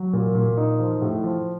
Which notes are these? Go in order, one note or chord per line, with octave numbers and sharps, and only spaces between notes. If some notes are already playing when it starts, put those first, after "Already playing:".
Already playing: F#3
A#2
A#2
D#4
F3
A2
F3